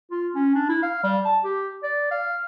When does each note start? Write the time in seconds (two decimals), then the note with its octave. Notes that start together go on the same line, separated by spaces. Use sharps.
0.11 F4
0.35 C#4
0.55 D4
0.69 E4
0.82 F5
1.03 G3
1.25 A5
1.44 G4
1.83 D5
2.11 F5